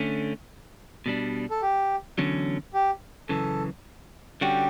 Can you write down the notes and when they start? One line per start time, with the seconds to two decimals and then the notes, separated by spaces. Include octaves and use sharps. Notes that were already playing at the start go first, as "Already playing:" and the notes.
Already playing: D3 A3 C#4
1.06 B2 G3 D4
1.51 A4
1.62 G4
2.18 E2 D3 F#3 C#4
2.74 G4
3.29 F#2 C#3 E3 A4
4.41 D3 G3 C#4 F#4 G4